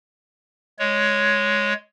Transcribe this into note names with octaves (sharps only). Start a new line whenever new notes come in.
G#3 C#5